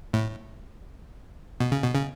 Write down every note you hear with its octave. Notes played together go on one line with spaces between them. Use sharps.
A2
B2
C#3
B2
C#3